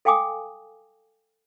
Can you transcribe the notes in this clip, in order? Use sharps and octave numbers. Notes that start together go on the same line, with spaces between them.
A4 F5 G5 G#5 D6 D#6